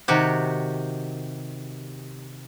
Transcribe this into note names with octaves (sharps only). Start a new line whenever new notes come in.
C3 D#3 F#4 G4